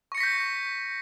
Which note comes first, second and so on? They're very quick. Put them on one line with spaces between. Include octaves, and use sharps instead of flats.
C#6 C#7 A#6 B6 G6